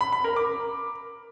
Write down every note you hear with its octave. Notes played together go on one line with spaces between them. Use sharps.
B5
B5
A#4
D6